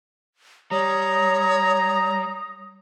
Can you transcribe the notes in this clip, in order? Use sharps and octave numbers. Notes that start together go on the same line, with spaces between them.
G3 C#5 A#5 D#6